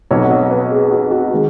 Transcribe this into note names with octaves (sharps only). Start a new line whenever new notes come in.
B1 B2 F#3 C#5
F#5
D#5
B4
G#4
F#4
F#4
D#3 G#3